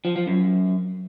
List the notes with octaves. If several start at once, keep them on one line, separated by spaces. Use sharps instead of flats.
F3
F3
F#2